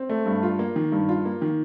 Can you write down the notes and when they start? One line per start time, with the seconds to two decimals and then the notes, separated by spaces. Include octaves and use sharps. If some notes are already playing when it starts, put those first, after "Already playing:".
Already playing: C4
0.09 A3
0.26 G2
0.43 F4
0.59 A#3
0.76 D#3
0.92 G2
1.09 F4
1.25 A#3
1.42 D#3